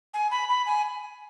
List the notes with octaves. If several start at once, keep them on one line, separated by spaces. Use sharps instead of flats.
G#5
B5
B5
G#5